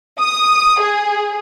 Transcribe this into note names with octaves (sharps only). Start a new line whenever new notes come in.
D#6
G#4